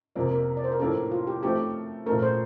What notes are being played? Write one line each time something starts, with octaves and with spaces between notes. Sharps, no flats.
F2 C3 F3 A#3 D5
A#4
D5
C5
A#4
A2 F3 A#3 D4 A4
F4
G4
F3 A3 C4 D#4 G4
A#2 F3 A3 A#4
C5